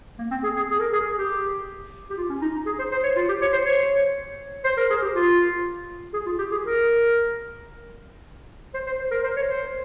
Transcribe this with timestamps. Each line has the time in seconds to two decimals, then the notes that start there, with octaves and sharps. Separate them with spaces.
0.19 A#3
0.31 C4
0.44 G#4
0.56 G#4
0.70 G#4
0.80 A#4
0.93 G#4
1.05 G#4
1.18 G4
2.10 G4
2.17 F4
2.30 C#4
2.42 D#4
2.66 G#4
2.79 C5
2.92 C5
3.03 C#5
3.17 F4
3.28 G4
3.42 C#5
3.53 C5
3.65 C#5
4.64 C5
4.78 A#4
4.90 G#4
5.02 G4
5.15 F4
6.14 G#4
6.26 F4
6.39 G4
6.51 G#4
6.63 A#4
8.74 C5
8.87 C5
8.99 C5
9.11 A#4
9.24 C5
9.36 C#5
9.48 C5